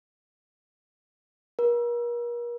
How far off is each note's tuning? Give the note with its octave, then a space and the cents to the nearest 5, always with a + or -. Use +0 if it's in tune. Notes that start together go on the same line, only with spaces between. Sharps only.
A#4 +40